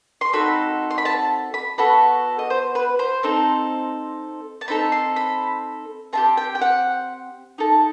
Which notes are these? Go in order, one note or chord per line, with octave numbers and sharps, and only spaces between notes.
C6
C4 D#4 F#4 A4 B5
C6
B5
A5
B5
B3 F#4 A4 B5
D#5
C5
B4
C5
C4 D#4 A4
A5
C4 D#4 A4 B5
C6
B5
C4 E4 G4 A5
G5
G5
F#5
D#4 A4